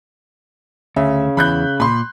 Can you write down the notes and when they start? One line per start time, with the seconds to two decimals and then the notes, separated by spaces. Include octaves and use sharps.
0.96 D2 C#3 E5
1.37 E2 E3 B5 F#6 G6
1.80 A#2 B5 C6